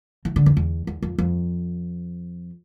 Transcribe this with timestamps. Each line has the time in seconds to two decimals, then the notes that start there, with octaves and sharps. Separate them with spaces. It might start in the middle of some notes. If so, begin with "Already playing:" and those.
0.25 E3
0.36 D3
0.46 E2
0.57 E2
0.87 E2
1.02 F2
1.18 F2